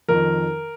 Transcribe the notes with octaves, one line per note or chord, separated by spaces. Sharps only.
F2 D#3 A#4